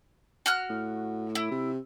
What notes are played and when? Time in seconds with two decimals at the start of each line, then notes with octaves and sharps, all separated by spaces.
0.46 F#4 F6 F#6
0.70 A2
1.35 E4
1.51 C3